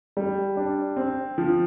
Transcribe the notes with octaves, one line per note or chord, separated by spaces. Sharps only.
G3
D4
C4
F3